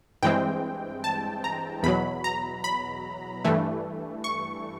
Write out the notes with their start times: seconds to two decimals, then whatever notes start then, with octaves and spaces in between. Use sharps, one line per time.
0.23 G2 E3 G#3 C4 G5
1.04 A5
1.44 A#5
1.83 E2 B2 F#3 B5
2.24 A#5
2.64 B5
3.45 G2 E3 A3
4.24 C#6